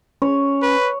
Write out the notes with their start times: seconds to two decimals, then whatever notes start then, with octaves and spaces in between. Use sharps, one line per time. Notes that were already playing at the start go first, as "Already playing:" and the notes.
0.22 C#4 C#5
0.62 B4